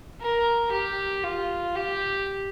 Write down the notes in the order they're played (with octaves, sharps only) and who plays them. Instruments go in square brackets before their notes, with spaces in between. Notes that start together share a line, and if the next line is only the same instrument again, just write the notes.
[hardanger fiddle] A#4
G4
F4
G4